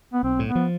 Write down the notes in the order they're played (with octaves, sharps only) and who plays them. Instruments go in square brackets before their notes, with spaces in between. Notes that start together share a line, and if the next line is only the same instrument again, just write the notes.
[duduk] B3
[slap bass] B1 [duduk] C4
[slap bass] A2
[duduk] B3
[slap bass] F3